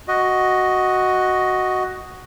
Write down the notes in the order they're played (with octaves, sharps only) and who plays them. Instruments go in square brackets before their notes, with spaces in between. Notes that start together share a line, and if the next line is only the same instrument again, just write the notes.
[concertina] F#4 D#5